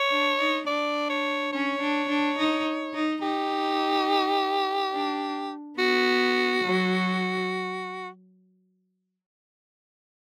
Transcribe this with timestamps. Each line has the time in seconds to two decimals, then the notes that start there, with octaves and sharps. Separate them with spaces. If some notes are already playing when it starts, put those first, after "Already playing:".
Already playing: C#5
0.10 D4
0.39 D#4
0.67 D4 D5
1.10 C#5
1.53 C#4 C#5
1.80 D4
2.09 D4
2.38 D#4
2.94 D#4
3.22 D#4 G4
4.93 D4
5.78 B3 F#4
6.64 F#3